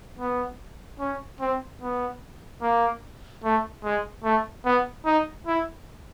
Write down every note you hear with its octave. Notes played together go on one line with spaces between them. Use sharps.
B3
C#4
C4
B3
A#3
A3
G#3
A3
B3
D#4
E4